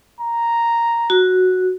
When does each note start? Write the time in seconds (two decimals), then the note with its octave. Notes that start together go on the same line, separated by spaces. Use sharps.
0.21 A#5
1.10 F#4